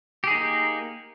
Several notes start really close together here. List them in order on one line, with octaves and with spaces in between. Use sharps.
G4 G#4 D#4 A#3